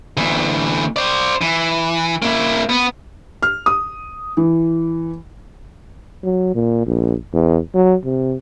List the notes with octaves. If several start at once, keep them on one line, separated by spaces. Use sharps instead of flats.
D2 E3
C5 D5
E3
A#3 E4
B3
F6
D#6
E3
F#3
A#2
A#1
E2
F#3
C3